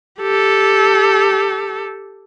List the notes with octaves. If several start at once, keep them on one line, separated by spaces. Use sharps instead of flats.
G4 A4